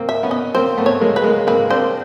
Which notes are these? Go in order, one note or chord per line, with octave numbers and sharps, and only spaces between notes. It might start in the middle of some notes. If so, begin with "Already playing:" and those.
Already playing: A#3 C4
E5
B3 C#4
D#5
A#3 C4 C5
A3 B3
C#5
G#3 A#3
B4
G#3 A#3
A#3 C4 B4
C4 D4 C5